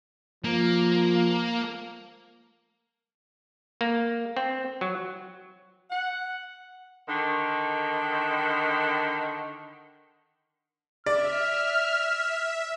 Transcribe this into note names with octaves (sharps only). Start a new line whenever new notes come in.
F3 A#3
A#3
C4
F#3
F#5
D3 D#3
D5 E5 F6